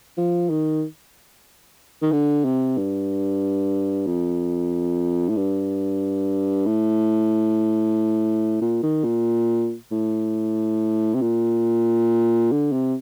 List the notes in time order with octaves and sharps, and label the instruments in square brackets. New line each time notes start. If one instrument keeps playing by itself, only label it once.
[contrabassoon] F3
D#3
D#3
D3
C3
G2
F2
A2
G2
A2
A#2
D#3
A#2
A2
C3
A#2
D3
C3